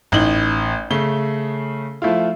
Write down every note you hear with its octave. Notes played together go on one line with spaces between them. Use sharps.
A1 D#4 F#7 G7
C#3 A3 G7
F3 A3 E4 F4